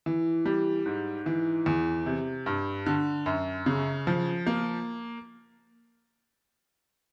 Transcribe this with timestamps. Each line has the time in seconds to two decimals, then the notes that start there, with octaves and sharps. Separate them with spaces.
0.06 E3
0.45 G3
0.86 G#2
1.26 E3
1.66 E2
2.06 C3
2.46 G2
2.86 D3
3.26 F#2
3.66 C#3
4.07 F3
4.47 A#3